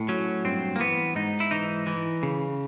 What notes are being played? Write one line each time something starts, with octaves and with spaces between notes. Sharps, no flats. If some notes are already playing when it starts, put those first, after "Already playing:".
Already playing: A2
F#3 C#4
G2 C4
A#3
E3 B3
G#2 D#4
E4
E3 D#4
E3
C#3